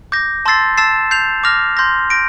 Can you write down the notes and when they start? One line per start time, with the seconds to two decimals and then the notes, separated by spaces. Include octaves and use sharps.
0.12 D6 G6 A#6
0.46 A5 C6 E6 A6 C7
0.77 A5 E6 A6 C7 E7
1.11 G6 C7 F7
1.44 D6 F6 A#6 F7
1.77 C6 G6 A#6
2.10 G6 A#6 D7